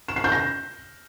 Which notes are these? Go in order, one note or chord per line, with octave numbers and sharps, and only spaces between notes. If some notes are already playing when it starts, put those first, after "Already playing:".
E7
C7
G6
A#6